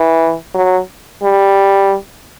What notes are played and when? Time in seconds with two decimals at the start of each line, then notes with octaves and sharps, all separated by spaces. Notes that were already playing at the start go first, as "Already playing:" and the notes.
Already playing: E3
0.55 F#3
1.23 G3